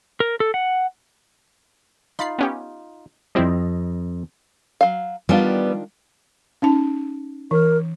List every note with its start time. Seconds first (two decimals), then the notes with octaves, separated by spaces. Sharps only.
0.20 A#4
0.40 A4
0.54 F#5
2.19 D#4 F4 B5 A6 C7
2.39 B3 C#4 G4
3.35 F2 G3 C4 E4 D#5
4.81 F#3 F5
5.29 D#3 G3 B3 D4 F4
6.62 C#4 D#4 A5
7.51 E3 A#4